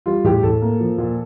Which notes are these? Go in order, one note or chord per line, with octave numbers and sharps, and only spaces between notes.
G3 F4
A2 G4
A2 A4
A#3
F3
A#2